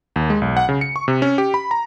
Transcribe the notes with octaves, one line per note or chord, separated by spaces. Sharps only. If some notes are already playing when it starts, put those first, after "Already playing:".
D#2
G#3
B1
F#5
C#3
C#7
C#6
C3
C#4
G4
B5
A#5